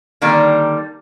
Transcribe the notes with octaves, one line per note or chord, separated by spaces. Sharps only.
D3 D#3 G3 A#3